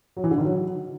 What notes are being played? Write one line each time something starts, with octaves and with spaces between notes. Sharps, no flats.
F#3
E3
D3
D#3
F#3